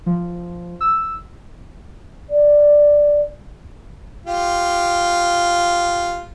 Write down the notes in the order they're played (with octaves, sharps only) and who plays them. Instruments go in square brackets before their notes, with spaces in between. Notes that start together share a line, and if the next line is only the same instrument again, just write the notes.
[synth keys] F3
E6
[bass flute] D5
[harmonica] F4 G4